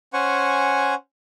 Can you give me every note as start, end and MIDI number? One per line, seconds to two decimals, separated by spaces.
0.13 0.94 61
0.13 0.94 72
0.13 0.94 78
0.13 0.94 80
0.13 0.94 85